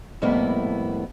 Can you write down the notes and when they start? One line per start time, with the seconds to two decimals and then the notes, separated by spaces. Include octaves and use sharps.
0.22 F2 A2 G3 A#3 B3 E4